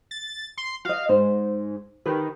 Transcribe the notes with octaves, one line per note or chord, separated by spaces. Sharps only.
A6
C6
F#4 D#5 F5
G#2 C5
D#3 G4 B4